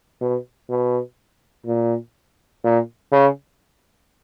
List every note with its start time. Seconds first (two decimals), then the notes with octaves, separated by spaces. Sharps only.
0.21 B2
0.69 B2
1.66 A#2
2.64 A#2
3.12 C#3